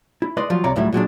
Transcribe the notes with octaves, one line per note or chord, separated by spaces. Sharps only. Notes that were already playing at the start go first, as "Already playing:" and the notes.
E4
G#3 B4 D5 D#5 C6
F3 F#3 F4
C2 C3 C#5 D5 A#5
C#2 A2 F#3 G3 E4
A#2 F#3 G#3 D4